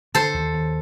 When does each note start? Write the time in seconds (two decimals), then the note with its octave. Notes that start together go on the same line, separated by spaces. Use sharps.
0.15 D3 A4 C5
0.34 D#2
0.53 D#2